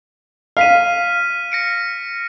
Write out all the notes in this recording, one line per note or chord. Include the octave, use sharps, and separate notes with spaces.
F5 F6 B6 D#7
A#6 C#7 D7